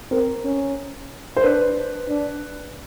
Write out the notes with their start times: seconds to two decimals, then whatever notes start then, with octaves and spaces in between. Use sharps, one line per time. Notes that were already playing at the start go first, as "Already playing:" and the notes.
0.11 C4 A#4
0.44 C#4
1.36 C5
1.43 D4 B4
2.09 D4